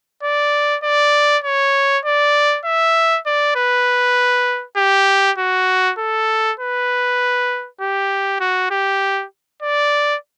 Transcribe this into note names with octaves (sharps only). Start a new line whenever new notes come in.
D5
D5
C#5
D5
E5
D5
B4
G4
F#4
A4
B4
G4
F#4
G4
D5